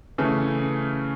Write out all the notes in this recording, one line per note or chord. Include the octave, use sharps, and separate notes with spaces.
C#3 E3 A3 C#4